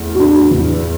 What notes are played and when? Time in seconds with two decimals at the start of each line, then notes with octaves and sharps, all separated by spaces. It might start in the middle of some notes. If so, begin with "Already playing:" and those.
Already playing: E2 A2
0.15 D4 F#4
0.50 E2 E3